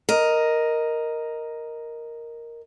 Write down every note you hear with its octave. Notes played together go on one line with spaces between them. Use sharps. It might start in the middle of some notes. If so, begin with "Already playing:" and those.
A#4 D#5